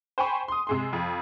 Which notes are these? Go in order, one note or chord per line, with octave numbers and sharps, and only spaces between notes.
C5 G5 G#5 B5 C#6
C6 D#6
C3 G#3 C6
F2